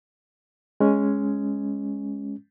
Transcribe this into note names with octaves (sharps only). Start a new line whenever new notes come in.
G#3 C#4